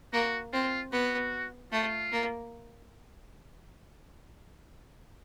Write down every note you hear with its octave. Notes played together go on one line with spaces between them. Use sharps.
A#3 F#4
C4 F4
B3 F#4
A3 F4
A#3